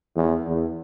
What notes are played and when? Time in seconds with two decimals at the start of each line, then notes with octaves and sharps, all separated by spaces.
0.16 E2
0.47 E2